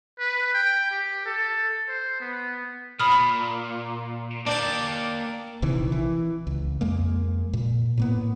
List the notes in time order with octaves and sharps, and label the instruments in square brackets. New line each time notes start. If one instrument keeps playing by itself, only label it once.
[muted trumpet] B4
G5
G4
A4
C5
B3
[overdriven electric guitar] A#2 [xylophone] B5 D#6 F6
[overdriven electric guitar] A#3 G5 [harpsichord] D4 D5
[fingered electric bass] A#1 C3 D#3 E3
E3
C#2
F2 G#3 A#3
A#2
A2 A#3 B3